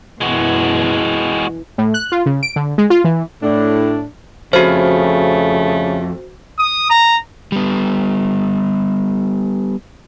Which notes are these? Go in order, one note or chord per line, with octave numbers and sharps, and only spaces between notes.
F#2 B2 E3 G#3 F#4
A2
F#6
F4
C#3
D7
D3
G#3
F4
E3
A2 D4
F2 C#3 A3 F#4 C5
D#6
A#5
G3 B3